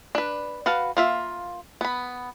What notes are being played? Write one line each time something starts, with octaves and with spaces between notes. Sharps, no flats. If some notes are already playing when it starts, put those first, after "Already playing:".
D4 B4
F#4 B4 F5 A5
A#3 F4 E5
B3 B5